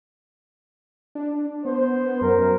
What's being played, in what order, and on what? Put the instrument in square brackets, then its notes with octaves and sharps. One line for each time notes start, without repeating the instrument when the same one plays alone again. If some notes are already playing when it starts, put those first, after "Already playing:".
[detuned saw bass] D4
[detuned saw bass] B3 [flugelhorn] C5
[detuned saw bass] F#2 [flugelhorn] A#4